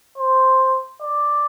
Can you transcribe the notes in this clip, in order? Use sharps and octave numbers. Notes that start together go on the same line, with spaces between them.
C5
D5